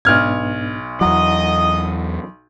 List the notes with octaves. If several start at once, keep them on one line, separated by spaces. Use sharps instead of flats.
B1 G#2 B3 D4 F6 G#6
E2 F#3 E4 D#5 F#5 A#5 D#6